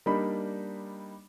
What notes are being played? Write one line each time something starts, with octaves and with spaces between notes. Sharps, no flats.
G3 A#3 D4 D#4 B5 B6